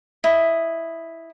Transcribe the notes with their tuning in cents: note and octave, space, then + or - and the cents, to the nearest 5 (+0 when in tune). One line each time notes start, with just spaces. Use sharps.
E4 +0 D#5 +0